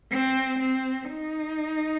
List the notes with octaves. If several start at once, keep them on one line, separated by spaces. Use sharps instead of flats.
C4
C4
D#4